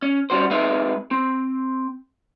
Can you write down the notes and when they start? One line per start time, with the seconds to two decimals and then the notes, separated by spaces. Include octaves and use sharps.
0.02 C#4
0.30 G3 C#4 F#4 C5
0.51 G#3 C4 D#4 G#4 B4 E5
1.11 C4